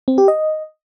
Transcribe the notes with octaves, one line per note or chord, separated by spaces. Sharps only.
C4
G4
D#5